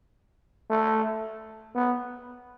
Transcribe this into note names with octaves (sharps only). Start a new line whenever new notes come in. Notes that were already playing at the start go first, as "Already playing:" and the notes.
A3
B3